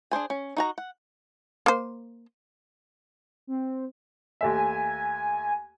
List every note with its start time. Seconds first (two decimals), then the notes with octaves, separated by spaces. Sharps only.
0.11 D4 G#4 C5 G#5
0.30 C#4
0.57 D#4 F#4 A#5
0.78 F#5
1.66 A#3 C5
3.47 C4
4.41 D#2 A3 E5 G#5